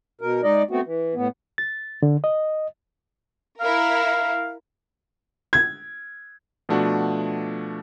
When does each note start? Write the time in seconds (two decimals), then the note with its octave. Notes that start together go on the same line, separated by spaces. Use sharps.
0.21 B2 A#4
0.43 G#3 D#4 D5 D#5
0.71 A3 B3 C4 F#4
0.85 E3
1.15 A2 B3
1.58 A6
2.03 D3
2.24 D#5
3.60 E4 A#4 F5
5.53 G#6
6.69 B2 F3 A3 D4 F#4